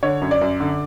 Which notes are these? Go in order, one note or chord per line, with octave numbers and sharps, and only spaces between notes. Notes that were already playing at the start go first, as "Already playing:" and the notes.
D3 C#5
F#2
D5
F#2
D3